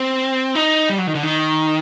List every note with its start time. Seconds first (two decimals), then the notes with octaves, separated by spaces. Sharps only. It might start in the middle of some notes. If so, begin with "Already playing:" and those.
Already playing: C4
0.55 D#4
0.90 G3
0.98 F#3
1.07 D#3
1.15 D3
1.23 D#3